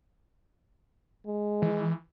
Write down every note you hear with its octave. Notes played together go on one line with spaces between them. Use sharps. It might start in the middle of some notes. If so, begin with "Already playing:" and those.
G#3
E3